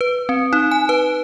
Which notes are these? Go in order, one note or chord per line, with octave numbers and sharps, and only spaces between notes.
B4
C4
D#4
G#5
B4